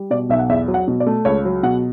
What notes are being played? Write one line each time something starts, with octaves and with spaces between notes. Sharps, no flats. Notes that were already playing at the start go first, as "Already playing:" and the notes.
Already playing: G3
B2 D5
B1 E5
F#5
E2 E5
F#3
F#5
B2
D5
A3
C#2 C#5
F#3
B2 F#5